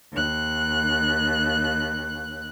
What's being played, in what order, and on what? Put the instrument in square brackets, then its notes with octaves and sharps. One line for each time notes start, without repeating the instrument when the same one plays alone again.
[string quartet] D#2 F#6